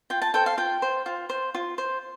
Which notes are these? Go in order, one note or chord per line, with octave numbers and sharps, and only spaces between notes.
F4 G5
A5
A4 C5 G5
F5
F4 G5
C5
F4
C5
F4
C5